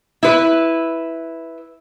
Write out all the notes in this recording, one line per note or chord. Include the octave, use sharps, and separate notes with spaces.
E4 B4